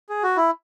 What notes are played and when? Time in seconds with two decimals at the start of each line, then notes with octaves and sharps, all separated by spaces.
0.09 G#4
0.23 F#4
0.37 E4